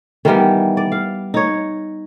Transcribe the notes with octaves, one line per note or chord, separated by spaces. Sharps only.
D#3 E3 G3 B3
D5
F5
D#4 C#5